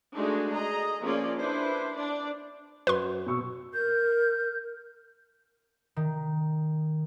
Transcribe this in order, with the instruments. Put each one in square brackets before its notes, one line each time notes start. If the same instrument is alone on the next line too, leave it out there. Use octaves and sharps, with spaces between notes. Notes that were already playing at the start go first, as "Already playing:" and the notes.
[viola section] G#3 A3 D4 D#4 F#4 G#4
G#4 D#5 A#5
F3 A#3 C#4 F4 G#4 D5
D4 E4 B4 C5
D4 D5
[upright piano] F#2 F#4 [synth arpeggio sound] B4 C6
[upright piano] B2 C#6 E6
[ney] A#4 [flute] G6
[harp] D#3